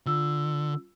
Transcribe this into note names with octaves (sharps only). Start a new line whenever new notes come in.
D3 F4 E6